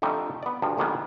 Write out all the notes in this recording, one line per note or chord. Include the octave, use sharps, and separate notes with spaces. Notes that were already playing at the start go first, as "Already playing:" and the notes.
F2 D3 G3 A3 D#4
B3 D5
D2 G2 F3
A#1 D3 D#3 G3 B3 G#5